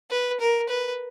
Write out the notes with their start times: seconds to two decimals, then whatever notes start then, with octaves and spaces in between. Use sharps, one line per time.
0.11 B4
0.40 A#4
0.69 B4